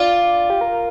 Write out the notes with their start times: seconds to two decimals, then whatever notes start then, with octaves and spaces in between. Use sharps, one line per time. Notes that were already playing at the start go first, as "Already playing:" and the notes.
Already playing: F4 D5
0.50 G4
0.61 A#4